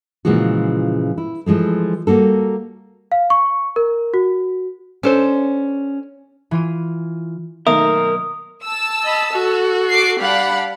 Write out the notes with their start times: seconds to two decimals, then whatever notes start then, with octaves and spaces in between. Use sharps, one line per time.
0.25 A#2 C#3 E3 F3 G#3 F#4
1.18 E4
1.46 E3 F3 G#3 A3
2.07 G3 A#3 F#4 A4
3.12 F5
3.30 C#6
3.76 A#4
4.14 F#4
5.03 C#4 D4 A4 C5
6.51 E3 F4 D#7
7.67 B1 D#3 A3 A#3 A#4 E5 D#6
8.64 A5 E6
9.03 D#5 B5
9.32 F#4 A4
9.90 D6 C7
10.20 G3 D4 F5 F#5 B5